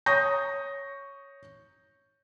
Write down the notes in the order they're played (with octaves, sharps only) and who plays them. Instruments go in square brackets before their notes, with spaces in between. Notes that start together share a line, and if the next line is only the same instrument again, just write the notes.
[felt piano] C#5 C#6 D#6 G6 A#6